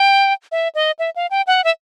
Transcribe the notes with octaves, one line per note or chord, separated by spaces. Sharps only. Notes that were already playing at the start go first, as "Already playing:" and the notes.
Already playing: G5
E5
D#5
E5
F5
G5
F#5
E5